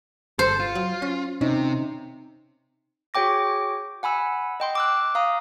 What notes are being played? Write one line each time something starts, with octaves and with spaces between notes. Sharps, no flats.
G1 A4 C5
F4
F#3
C#4
C3 C4 C#4 D#4
F#4 G#4 C#5 G5 D6 A#6
F#5 G#5 B5 E6
D#5 G5 C6
D6 E6 F#6
F5 A#5 D#6